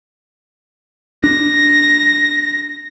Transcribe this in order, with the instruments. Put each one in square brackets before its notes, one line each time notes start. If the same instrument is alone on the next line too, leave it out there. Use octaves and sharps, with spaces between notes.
[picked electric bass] D4 [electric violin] A#6